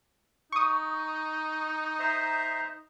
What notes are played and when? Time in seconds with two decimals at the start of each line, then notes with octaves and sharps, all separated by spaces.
0.52 D#4 C#6 D#6
1.99 C5 E5 A#5